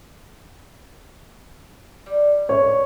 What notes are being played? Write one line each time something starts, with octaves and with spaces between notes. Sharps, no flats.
G3
C#5